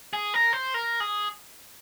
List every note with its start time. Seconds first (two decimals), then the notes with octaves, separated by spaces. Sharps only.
0.13 G#4
0.34 A#4
0.53 C5
0.74 A#4
1.00 G#4